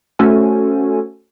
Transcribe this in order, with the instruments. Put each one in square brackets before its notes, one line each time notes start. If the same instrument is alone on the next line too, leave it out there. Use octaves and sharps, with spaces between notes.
[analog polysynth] A3 C#4 F#4 A4 C5 G#5